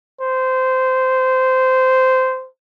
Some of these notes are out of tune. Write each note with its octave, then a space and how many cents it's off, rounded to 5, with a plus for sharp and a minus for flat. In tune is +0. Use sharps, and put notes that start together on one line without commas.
C5 -15